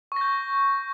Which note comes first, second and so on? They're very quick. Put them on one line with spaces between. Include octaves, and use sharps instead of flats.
C#6 A#6 G6